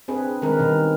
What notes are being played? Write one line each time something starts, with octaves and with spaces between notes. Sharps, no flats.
C4 D4 G#4 B4
D#3 G#3 C4 A#4 B4
B2 D#3 G3